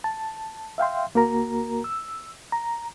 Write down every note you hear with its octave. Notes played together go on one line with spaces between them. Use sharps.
A5
E5 F5 G5 C6
D2 A#3 F#4 A#4 A#5
E6
A#5